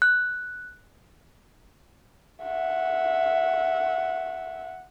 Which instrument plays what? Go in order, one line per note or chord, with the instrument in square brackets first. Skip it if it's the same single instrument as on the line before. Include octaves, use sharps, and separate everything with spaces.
[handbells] F#6
[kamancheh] E5 F#5